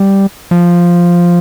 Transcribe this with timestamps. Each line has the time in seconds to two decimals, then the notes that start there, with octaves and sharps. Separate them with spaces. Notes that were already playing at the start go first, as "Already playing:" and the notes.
Already playing: G3
0.51 F3